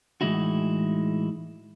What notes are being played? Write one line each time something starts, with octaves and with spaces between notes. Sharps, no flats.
A2 E3 G#3 D#4 E4 F#4